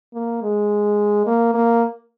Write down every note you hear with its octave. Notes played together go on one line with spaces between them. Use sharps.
A#3
G#3
A#3
A#3